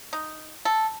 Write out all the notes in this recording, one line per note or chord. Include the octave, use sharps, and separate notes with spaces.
D#4
A4